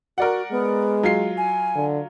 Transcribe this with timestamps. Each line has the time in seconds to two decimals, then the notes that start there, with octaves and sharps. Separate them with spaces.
0.18 F#4 A#4 D5 F#5
0.51 G#3 B3
1.03 F#3 F4 C7
1.38 G#5
1.75 D3